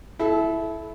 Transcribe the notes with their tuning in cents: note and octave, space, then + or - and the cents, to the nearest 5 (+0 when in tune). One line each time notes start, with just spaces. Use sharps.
E4 +0 A4 -30